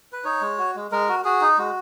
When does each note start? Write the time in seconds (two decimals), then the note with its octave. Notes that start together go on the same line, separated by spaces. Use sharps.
0.13 B4
0.24 D#4 C#5
0.42 G#3
0.58 F#4
0.76 G#3
0.91 G#3 A#4
1.09 F#4
1.25 F#4 G#4
1.41 D#4
1.58 G#3 F#4